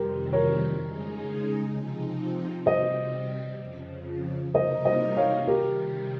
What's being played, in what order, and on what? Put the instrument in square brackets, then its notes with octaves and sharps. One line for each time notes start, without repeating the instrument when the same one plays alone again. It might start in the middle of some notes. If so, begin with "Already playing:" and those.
Already playing: [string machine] F2 C3 D#3 G3 C4 [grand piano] G4 A#4
[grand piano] A#4 C#5
[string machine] C#3 G#3 D#4 G#4
C3 F3 C4 D#4
[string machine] C3 G3 C4 [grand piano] C5 D#5
[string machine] F2 C#3 F3
[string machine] C3 G3 A#3 D#4 A#4 [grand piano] C5 D#5
[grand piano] C5 D#5
C#5 F5
[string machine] C3 D#3 G3 [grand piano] G4 A#4